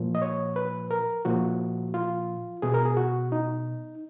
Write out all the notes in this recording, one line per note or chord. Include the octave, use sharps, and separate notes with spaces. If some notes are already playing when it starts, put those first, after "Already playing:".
Already playing: A#2 F3
D#5
C#5
B4
A#4
A#2 F3 F#4
F4
B2 G#4
A#4
G#4
F#4
D#4